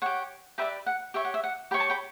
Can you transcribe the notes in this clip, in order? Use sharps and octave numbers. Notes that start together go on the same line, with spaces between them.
G4 C#5 F#5
G4 B4 D5 E5 G5
F#5
G4 C#5 E5
F#5
E5
F#5
G4 C#5 G5 B5
A5 C#6
G5 B5